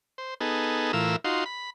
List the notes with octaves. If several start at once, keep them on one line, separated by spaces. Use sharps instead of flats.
C5
B3 D#4 G#4 A4
A2 E3 F4 A#4 E6
D#4 F4 F#4 C6
B5